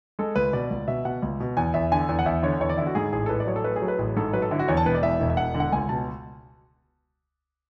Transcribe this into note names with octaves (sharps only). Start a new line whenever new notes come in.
G#3 A4
C#2 B4
B2 D5
C#2
B2 E5
B2 F#5
C#2
B2
E2 G#5
E2 E5
D3 G#5
E2
F#5
E2 E5
D3 C#5
E2 C#5
D5
D3 E4
F#4
G#2 G#4
A1 G#4
A4
A1 B4
D5
F#3 C#5
A4
A3 B4
G#4
F#3
B4
A1 G#4
G#2 A4
F#3 B4
A4
D3 E4
F#4
E2 C#5
A5
E1 B4
D5
E2 E5
E1
E5
E1 F#5
D3
F#5
C#2 G#5
B2 A5